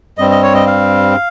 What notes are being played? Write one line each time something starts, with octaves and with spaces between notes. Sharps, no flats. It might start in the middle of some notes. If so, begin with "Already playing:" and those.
G2 G3 C4 D#5
D#5
C#5
D#5
F5